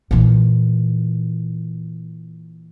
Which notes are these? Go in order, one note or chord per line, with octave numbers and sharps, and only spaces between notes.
A#2 E3